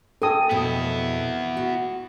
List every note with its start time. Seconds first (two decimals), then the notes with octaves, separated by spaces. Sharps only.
0.22 A4 G5 G#5 D#6
0.51 F2 B2 B3 E4
1.57 F#4